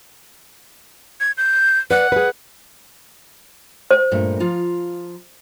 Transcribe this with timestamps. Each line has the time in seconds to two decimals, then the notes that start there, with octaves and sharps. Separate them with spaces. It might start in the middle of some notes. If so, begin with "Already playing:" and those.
1.20 G#6
1.37 G6
1.91 B4 D5 F#5
2.12 G#4 B4
3.91 C5
4.12 G2 A#2 A3
4.40 F3 F4 A#5